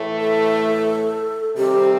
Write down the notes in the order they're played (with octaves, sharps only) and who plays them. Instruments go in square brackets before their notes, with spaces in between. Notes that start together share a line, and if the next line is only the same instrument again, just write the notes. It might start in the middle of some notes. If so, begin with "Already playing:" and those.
Already playing: [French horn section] A2 E3 A3
[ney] A4
[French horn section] C3 D#3 G3 C4 [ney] G4